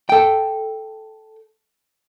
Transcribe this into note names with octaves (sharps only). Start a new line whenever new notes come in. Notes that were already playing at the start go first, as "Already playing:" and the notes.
A4 G5